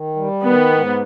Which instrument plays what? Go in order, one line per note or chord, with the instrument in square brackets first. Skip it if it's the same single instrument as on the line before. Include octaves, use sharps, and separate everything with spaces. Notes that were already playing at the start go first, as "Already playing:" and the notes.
Already playing: [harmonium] D#3
G3
[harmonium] D#3 [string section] B3
[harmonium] G#2